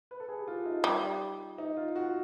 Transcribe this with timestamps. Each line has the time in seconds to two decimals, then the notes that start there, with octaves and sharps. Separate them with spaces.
0.11 B4
0.20 A4
0.29 G#4
0.38 G4
0.48 F4
0.66 D#4
0.84 G3
1.58 D#4
1.77 F4
1.96 F#4